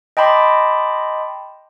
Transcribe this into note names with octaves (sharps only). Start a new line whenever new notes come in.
D#5 G5 A5 B5 C6 D6